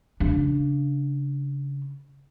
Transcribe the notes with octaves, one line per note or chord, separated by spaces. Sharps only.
C#3 D4